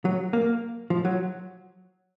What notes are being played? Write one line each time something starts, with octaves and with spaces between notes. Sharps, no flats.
F#3
A#3
F3
F#3